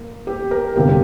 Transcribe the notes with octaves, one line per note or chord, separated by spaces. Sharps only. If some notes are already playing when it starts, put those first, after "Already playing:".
Already playing: A#3
G4
A#4
G1 F2 C3 G3 A#3 G4